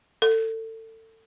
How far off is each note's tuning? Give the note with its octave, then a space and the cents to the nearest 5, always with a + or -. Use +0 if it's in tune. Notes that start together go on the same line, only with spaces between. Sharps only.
A4 +25